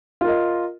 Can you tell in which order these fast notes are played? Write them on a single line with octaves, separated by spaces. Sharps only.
F4 A#4 D#5